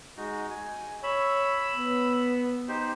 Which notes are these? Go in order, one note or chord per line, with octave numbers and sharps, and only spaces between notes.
G#3 D#4 F#4
G#5
C#5 B5 E6
B3
D#4 G4 C5